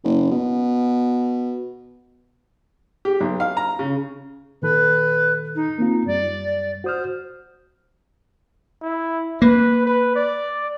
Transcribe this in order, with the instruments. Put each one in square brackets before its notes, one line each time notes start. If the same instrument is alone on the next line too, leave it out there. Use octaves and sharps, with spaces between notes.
[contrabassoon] F#1
B2
[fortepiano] G4
B1
F5
A#5
C#3
[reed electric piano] A#2 D#3 A4 [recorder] B4
[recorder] D#4
[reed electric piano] A#3 C4 F4
[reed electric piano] F#2 G3 [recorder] D5
[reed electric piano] F#4 D#6 F6 [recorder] C5
[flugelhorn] E4
[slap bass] A#3 [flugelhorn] B4
[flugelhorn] B4
D5